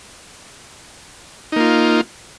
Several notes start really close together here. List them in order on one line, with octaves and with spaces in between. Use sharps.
D#4 A#3 F4